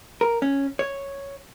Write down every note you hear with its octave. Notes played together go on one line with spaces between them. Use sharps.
A#4
C#4
C#5